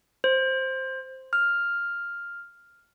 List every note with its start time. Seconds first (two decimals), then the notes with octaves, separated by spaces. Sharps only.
0.24 C5
1.33 F6